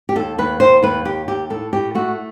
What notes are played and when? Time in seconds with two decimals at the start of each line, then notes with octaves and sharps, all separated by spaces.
0.09 G4
0.16 D#2 A4
0.38 D#2 B4
0.60 D#2 C5
0.83 D#2 B4
1.05 D#2 G4
1.28 D#2 G4
1.50 A2 A4
1.73 A2 G4
1.95 A3 F#4